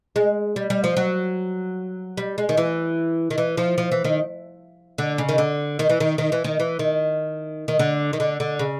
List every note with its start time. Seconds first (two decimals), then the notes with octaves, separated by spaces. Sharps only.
0.16 G#3
0.56 G3
0.70 G3
0.84 F3
0.97 F#3
2.17 G3
2.38 G#3
2.49 D#3
2.57 E3
3.30 D#3
3.38 E3
3.57 F3
3.78 F3
3.92 E3
4.04 D#3
4.98 D3
5.18 C#3
5.29 D#3
5.38 D3
5.79 D#3
5.90 E3
6.00 D#3
6.18 D#3
6.32 E3
6.44 D#3
6.60 E3
6.79 D#3
7.68 D#3
7.79 D3
8.13 D#3
8.20 D3
8.40 D3
8.59 C#3